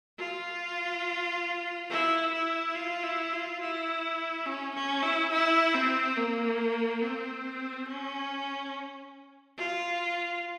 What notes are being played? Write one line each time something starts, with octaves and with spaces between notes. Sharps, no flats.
F4
E4
E4
F4
E4
F4
E4
C#4
C#4
E4
E4
C4
A#3
C4
C#4
F4